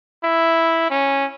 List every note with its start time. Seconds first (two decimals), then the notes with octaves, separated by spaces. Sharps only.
0.24 E4
0.90 C#4